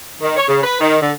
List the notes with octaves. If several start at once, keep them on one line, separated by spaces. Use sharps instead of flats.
D#3
C#5
C#3
B4
D#3
D3